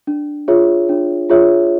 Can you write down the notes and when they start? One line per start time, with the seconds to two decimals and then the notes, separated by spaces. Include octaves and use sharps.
0.07 D4
0.48 F4 G#4 C#5 E5
0.89 D4
1.29 F4 G#4 C#5 E5